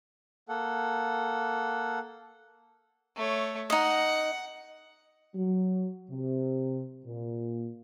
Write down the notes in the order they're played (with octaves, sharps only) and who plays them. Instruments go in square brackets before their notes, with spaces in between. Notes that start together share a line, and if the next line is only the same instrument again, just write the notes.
[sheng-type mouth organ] A#3 A4 F#5
[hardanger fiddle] A3 C#5
[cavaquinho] D#4 D#5 [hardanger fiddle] F#5
[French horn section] F#3
C3
A#2